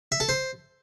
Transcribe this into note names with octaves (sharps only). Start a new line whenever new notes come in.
E5
A4
C5